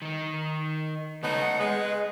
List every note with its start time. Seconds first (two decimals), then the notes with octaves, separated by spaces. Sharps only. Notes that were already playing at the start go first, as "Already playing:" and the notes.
0.02 D#3 D#4
1.23 C#3 A3 B3 D#4 B4 C#5
1.42 F#5
1.60 G#3 B4